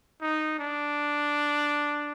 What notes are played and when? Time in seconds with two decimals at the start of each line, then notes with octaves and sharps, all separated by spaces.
0.21 D#4
0.59 D4